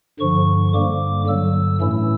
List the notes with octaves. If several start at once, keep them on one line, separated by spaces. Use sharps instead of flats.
G2 D3 F3 C#6
G2 D3 G3 A#3 D6
G2 D3 F#3 E6
A2 E3 A3 C#4 E4 E6